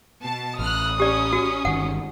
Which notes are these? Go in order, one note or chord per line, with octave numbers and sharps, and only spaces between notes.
B2 A5
A1 D#6 F6 F#6
C#4 G4 D5
F#4
G1 D#3 F#5